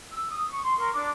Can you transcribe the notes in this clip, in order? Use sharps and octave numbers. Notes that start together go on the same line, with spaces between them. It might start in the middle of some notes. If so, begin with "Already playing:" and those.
E6
D#6
C#6
C6
A#4 C6 C#6
D4 D6